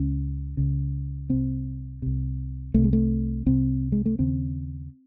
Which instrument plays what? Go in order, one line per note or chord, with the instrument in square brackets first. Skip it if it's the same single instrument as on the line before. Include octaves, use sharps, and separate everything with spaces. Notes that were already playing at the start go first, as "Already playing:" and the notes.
Already playing: [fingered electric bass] C#2 C#3 C#4
C#2 C#3
C2 C3 C4
C2 C3
C2 C3 A3
G#3
A3
C2 C3 C4
G#3
A3
D#2 C#3 C4